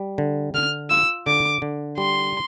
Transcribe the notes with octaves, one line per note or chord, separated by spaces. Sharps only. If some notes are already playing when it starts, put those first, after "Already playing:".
Already playing: G3
D3
D3 F6
F4 E6
D3 D6
D3
G3 C6